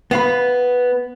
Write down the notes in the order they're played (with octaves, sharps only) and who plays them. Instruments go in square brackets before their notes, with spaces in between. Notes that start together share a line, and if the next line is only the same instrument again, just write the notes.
[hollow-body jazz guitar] B3 F5 B5